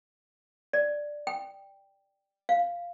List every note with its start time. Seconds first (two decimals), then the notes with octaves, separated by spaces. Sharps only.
0.73 D5
1.27 G5
2.49 F5